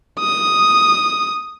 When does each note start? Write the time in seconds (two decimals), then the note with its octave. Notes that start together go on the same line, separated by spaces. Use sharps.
0.20 D#6